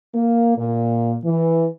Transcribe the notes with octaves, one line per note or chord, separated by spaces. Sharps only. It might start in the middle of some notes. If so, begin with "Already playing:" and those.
A#3
A#2
E3